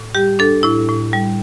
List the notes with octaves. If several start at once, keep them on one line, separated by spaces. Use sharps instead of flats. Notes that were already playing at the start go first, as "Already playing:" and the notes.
Already playing: A2
G3 G4
D4 A4
A2 E4
A2
G3